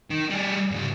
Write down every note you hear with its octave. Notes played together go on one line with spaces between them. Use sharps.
D#3
G3 G#4
G#2 C#3